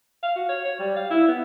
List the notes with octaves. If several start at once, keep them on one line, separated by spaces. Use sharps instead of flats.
F5
F#4
C#5
C#5
G3
F5
E4
B3